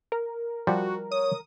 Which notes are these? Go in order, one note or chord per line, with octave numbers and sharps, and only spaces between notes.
A#4
F3 G3 F#4
C#5 D#6